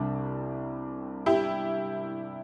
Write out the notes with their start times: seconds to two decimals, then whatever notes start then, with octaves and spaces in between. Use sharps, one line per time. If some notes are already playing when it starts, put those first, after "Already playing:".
Already playing: C2 C3 G3 D4
1.26 E4 G4